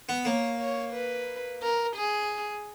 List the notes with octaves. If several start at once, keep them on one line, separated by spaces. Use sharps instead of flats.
B3
A#3 C#5
C#5
B4
A#4
G#4